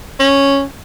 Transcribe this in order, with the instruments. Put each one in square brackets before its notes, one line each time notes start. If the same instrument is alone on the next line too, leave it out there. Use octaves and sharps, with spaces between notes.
[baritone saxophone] C#4